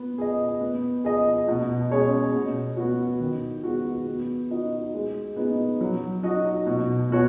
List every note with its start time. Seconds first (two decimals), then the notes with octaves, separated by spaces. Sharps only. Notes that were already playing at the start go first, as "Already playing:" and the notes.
Already playing: B3
0.18 G#4 D#5
0.61 B3
1.04 G#4 D#5
1.48 B2
1.91 G#3 C#4 G#4 C#5
2.34 B2
2.77 B3 F#4
3.20 D#3
3.64 G#3 B3 F#4
4.07 B3
4.50 D#4 F#4 D#5
4.94 G#3
5.36 B3 D#4 G#4
5.81 F#3
6.23 D#4 F#4 D#5
6.66 B2
7.10 B3 F#4 C#5